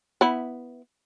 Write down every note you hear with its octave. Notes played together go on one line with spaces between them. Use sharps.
B3 E4